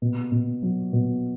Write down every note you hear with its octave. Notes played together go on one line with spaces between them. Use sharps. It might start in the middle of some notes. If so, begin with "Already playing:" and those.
B2
B2
F#3
B2